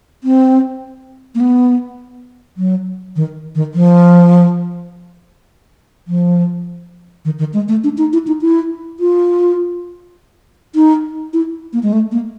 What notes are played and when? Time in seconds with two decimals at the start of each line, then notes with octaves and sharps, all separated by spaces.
0.24 C4
1.35 A#3
1.40 B3
2.57 F#3
3.16 D#3
3.55 D#3
3.74 F3
6.07 F3
7.25 D#3
7.39 D#3
7.53 G#3
7.68 A3
7.84 D4
7.98 D#4
8.13 E4
8.27 D#4
8.41 E4
9.00 F4
10.75 D#4
11.33 E4
11.73 A#3
11.83 G#3
11.93 A3
12.12 A#3